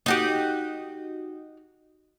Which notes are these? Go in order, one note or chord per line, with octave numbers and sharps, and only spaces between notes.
D#4 F#4 G4